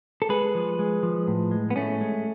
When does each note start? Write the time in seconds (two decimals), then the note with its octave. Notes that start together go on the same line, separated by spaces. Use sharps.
0.22 A4
0.29 G#3 G#4 B4
0.55 F3
0.79 G#3
1.03 F3
1.27 A2
1.51 G#3
1.70 B3
1.76 A2 A3 C#4
2.01 G#3